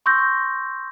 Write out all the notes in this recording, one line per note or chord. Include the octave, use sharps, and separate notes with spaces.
C6 C#6 E6 G6 A#6